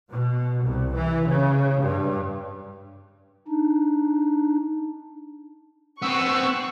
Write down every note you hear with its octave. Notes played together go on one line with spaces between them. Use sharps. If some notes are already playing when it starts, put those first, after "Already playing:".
B2
C2
E3
C#3
G2
D4 D#4
B3 C4 C#6 E6 F#6